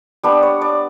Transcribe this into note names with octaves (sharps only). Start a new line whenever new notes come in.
G3 B3 D4 B4
C#5
D5